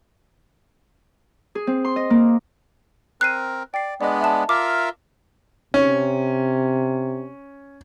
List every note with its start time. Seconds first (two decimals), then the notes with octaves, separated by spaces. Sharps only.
1.55 G#4
1.67 C4
1.84 C6
1.96 D#5
2.10 A#3
3.21 C4 A#4 F#6 C7 D#7
3.74 D5 G5 C7
4.01 G#3 B3 D4 D5 D#5
4.21 E5 A5
4.49 F4 A#4 E5 D6
5.74 C3 C#4